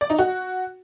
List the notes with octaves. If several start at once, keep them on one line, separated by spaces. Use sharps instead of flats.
D5
D#4
F#4